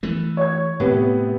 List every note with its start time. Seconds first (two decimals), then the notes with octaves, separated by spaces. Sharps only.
0.03 E3 A3
0.37 C#5 G#6
0.80 A2 C3 B3